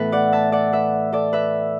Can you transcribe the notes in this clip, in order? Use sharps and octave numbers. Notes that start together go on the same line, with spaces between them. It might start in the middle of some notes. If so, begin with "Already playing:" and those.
Already playing: A2 E3 B3 A4 B4 E5
D5 F#5
E5 A5
D5 F#5
B4 E5
A4 D5
B4 E5